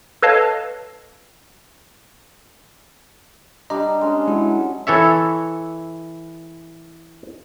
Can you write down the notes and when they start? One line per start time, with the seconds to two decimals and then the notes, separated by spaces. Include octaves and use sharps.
0.22 A4 B4 C#5 D#5 F5 A5
3.70 G3 D4 D#5 A#5
4.01 G#3 C#4
4.28 F#3 G#3 E4
4.87 E3 A4 C#5 E5